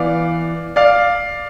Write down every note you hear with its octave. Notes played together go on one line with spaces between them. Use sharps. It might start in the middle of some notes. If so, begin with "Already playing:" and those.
Already playing: E3 B3 D5 F5
D5 F5